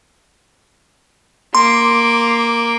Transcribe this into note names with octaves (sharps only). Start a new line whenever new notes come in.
A#3 C6 D6